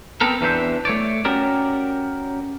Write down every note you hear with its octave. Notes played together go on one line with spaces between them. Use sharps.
B3 C4 A4 A#4
E2 E3 D4 C5 E5
A3 C#5 D5
C#4 F#4 G4 A#4 D5